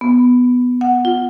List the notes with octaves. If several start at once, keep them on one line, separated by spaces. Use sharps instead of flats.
B3
F#5
F4